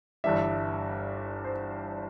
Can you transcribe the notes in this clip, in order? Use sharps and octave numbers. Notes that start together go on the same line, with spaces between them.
G1 G2 E3 G3 E5
C5